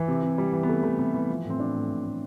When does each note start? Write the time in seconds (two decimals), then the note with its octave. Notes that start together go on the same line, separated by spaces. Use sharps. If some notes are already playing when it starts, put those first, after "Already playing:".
Already playing: E3
0.08 C3
0.23 C3
0.38 C3 G3
0.53 E3
0.63 B3
0.69 C3 A3
0.83 E3 A3
0.99 C3 B3
1.14 E3
1.29 F3
1.45 A2
1.50 C4
1.59 F3 D4
1.75 A2
1.89 A2
2.04 A2